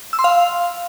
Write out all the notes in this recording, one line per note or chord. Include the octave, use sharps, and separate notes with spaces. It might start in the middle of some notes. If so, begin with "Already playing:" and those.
E6
C6
F5